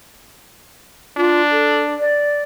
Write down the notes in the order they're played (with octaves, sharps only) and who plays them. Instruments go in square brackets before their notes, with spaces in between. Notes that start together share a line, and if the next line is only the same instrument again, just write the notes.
[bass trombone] D4 [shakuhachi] F4
[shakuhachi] A4
D5